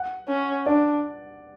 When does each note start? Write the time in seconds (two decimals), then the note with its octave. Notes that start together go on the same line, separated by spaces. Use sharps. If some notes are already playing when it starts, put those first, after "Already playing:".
Already playing: F#5
0.28 C#4
0.66 D4 D5